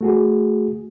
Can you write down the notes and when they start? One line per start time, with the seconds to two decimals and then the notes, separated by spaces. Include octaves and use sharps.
0.01 A3 F#4 G#4